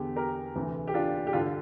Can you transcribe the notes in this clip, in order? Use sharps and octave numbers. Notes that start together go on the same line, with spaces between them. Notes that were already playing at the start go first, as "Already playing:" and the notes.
Already playing: E2 D3 G4
G4 A#4
D2 C3 E3
G4
D4 F4
G4
G2 D3 D4 F4